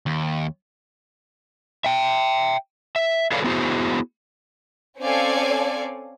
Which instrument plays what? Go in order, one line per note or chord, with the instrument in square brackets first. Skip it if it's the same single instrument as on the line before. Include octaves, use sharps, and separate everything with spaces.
[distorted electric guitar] D#2
[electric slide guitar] E5 G5
E5
G#4 A4 B4 C#5 D5 F5
B3 E4 F#4 G#4 C5
[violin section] C4 C#4 A4 D5 F5 G#5